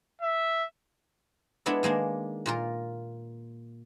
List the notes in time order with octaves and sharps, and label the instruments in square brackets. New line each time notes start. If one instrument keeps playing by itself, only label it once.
[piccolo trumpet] E5
[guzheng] G#3 B3 D4 E4 G#4 A4
D#3 G#3 A#3 D4
A#2 F4 A#4